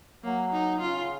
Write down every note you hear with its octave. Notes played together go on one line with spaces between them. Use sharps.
F#3 A#3
D#4
C#3 F4